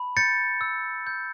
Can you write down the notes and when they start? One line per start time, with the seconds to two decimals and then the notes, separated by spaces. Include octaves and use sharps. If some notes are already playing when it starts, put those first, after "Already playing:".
Already playing: A5 B5
0.17 G6 A6 C#7
0.61 E6
1.07 G6